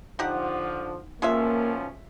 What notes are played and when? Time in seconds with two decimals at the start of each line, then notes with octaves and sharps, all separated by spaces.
0.19 D3 F3 D#4 G4 F#5
1.22 B1 F3 G#3 A#3 C#4 F4 E5